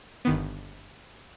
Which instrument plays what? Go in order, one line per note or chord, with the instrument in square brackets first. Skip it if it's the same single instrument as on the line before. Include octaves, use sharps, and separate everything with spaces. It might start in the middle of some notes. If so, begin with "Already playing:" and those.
[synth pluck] G1 D#3 B3